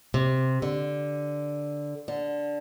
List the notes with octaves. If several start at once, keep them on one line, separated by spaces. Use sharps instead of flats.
C3
D3
D3